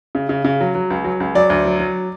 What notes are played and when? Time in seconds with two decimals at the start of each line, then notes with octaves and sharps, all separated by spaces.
0.15 C#3
0.29 C#3
0.45 C#3
0.60 F#3
0.75 F#3
0.90 C#2
1.04 F#3
1.20 C#2
1.35 F#3 D5
1.50 D2
1.65 F#3
1.79 F#3